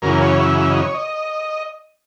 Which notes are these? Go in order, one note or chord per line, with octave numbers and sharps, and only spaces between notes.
F#2 C#3 E3 A#4
C#5
E5
E5
D#5
C#5
D#5